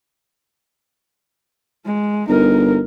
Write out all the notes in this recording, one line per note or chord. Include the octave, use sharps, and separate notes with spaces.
G#3
G1 D#4 A#4